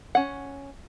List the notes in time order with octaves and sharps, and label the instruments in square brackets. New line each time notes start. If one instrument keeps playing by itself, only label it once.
[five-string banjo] C#4 F#5